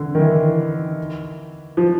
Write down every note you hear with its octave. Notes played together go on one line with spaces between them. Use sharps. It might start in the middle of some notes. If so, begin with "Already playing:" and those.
Already playing: D3 E3
D#3
E3
F3